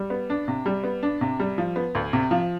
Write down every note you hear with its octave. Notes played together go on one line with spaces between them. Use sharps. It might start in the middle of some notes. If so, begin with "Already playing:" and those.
Already playing: G3
B3
D4
C3
G3
B3
D4
C3
G3
F3
B3
D2
C3
F3